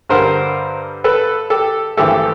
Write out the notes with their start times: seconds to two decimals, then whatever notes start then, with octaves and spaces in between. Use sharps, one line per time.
0.09 G2 D3 G3 A#4 C5
1.04 A4 B4
1.50 G4 A4
1.97 G#1 G2 E3 A3 G4 A4